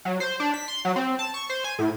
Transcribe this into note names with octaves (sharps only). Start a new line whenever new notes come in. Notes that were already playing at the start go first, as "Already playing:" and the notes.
F#3
C5
D4
B6
C6
F#3
C4
A5
C#6
C5
G#5
A2